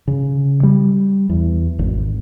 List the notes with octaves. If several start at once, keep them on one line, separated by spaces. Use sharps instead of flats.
C#3
G3
E2
G#1